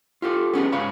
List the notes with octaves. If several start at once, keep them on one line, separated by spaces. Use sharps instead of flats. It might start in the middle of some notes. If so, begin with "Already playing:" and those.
F4 G4 A4
B3 C#4 D#4 G#4
G#2 G#3 C#5 F5 B5